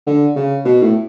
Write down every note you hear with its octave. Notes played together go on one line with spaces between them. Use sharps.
D3
C#3
B2
A2